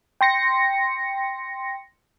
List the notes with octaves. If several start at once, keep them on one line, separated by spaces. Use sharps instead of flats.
G5 C6 A#6 C#7